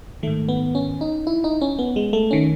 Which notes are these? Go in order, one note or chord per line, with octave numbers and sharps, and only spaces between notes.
G#2 D#3 A3
B3
C#4
D#4
E4
D#4
C#4
B3
G#3
A3
D#3 C#4